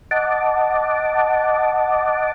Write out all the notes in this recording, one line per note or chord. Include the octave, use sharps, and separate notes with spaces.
D#5 F#5 A5 D6